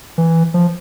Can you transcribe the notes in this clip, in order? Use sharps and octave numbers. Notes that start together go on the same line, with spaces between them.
E3
F3